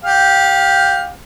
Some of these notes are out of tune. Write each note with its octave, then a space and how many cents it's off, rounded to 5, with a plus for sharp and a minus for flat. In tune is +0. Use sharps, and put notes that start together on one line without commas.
G4 +0 F5 +25